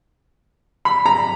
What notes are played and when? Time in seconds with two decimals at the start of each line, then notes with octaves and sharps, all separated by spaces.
0.85 B5
1.06 A#5